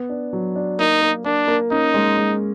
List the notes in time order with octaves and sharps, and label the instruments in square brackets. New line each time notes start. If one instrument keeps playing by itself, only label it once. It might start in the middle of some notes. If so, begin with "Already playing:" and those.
Already playing: [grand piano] B3
D4
F#3
D4
[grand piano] A#3 [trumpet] D#4
[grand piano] A#3
[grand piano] A#3 [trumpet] D4
[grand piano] A#3
[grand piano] C#4 [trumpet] D#4
[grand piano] G#3
G#3